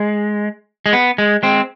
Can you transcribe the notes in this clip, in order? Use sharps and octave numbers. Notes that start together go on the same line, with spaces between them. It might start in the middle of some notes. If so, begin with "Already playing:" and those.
Already playing: G#3
G#3
B3
G#3
G#3 C4